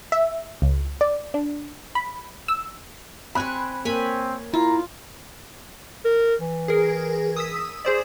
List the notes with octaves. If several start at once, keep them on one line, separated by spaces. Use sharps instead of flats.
E5
C#2
D5
D4
B5
E6
C4 G#5 B5 C#6 F#6
A#3 C4 C#5 G#5 B5
E4 F4 A#5
A#4
E3
G#4 A#4
D#6 E6 B6
G#4 C5 D5